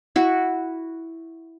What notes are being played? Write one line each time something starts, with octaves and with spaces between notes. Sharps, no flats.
E4 F#4